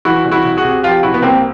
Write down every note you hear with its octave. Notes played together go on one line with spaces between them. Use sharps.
E3 E4 F#4
C2
E4 F#4
C2
F#4 G#4
C3
F3 F4 G4
C2 E4 F#4
B3
C2 A#3 C4